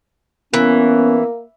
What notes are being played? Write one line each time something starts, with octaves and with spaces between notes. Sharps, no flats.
E3 A#3 B3 C#4